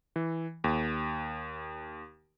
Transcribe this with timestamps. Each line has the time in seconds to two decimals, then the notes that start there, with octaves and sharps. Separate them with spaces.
0.16 E3
0.64 D#2